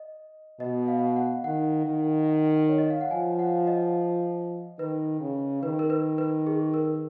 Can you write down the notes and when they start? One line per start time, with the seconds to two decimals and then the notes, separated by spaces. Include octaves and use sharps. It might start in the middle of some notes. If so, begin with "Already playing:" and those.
Already playing: D#5
0.60 B2 D#5
0.88 F5
1.16 F#5
1.44 D#3 F#5
1.86 D#3
2.69 C#5
2.78 D#5
2.90 F5
3.01 F#5
3.11 F3 G#5
3.39 F#5
3.67 D#5
4.79 D#3 B4
5.20 C#3
5.63 D#3 B4
5.79 A#4
5.90 B4
6.18 B4
6.47 G#4
6.74 A#4